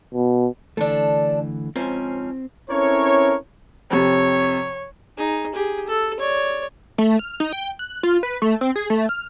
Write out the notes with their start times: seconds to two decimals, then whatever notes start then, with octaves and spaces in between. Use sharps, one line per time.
0.14 B2
0.77 D3 E3 A3 D4 A4
1.76 G#2 F3 C4 C#4
2.70 C4 C#4 E4 A4 A#4 C#5
3.90 F2 C3 C#5
5.17 D#4 G#4
5.54 G4 G#4
5.88 A4
6.20 C#5 D5
6.98 A3
7.19 F6
7.40 D#4
7.52 G5
7.79 F#6
8.03 F4
8.23 B4
8.42 A3
8.61 C4
8.76 G#4
8.90 A3
9.09 F6